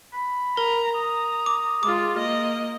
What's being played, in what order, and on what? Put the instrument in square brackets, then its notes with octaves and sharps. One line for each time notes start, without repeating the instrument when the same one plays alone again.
[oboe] B5
[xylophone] A#4 [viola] A#5
[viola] A#5 [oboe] D#6
[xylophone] D6
[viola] G#3 F4 [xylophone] D6
[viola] A#3 D#5